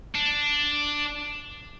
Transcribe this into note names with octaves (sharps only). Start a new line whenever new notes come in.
D4